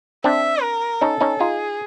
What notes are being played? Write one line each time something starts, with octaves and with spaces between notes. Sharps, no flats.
C4 D4 E5
A#4
C#4 D#4 A4
C#4 D#4
D#4 F4 G#4